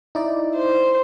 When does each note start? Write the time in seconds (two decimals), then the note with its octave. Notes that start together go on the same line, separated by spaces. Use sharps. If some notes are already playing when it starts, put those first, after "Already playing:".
0.15 D#4 E4 D5
0.55 C5